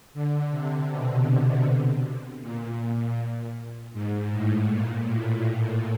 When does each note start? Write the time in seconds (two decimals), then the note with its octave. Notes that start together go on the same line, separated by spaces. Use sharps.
0.14 D3
0.51 C3
0.89 B2
2.41 A#2
3.93 G#2
4.31 A2
4.69 A#2
5.07 A2